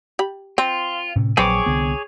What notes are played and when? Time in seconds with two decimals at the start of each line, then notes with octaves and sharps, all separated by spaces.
0.19 G4 B5
0.58 C4 F4
1.16 A2 C3 C#4
1.37 A#1 F#3 C4 G#4 B4 C#5 D6
1.66 C2 D3 B3